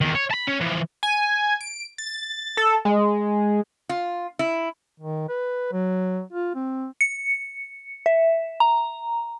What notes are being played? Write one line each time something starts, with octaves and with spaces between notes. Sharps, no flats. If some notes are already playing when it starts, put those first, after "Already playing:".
E2 D#3
C#5
A5 B5
C#4
E3 F3
G#5
D7
A6
A4
G#3
F4
E4
D#3
B4
F#3
F4
C4
C#7
E5
A#5